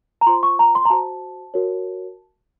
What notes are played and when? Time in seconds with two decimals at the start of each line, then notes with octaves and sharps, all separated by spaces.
0.21 A#5
0.27 F4 C5 C6
0.43 C#6
0.59 A#5
0.75 C6
0.85 A#5
0.90 F#4 C5 A5
1.54 F#4 A#4 C#5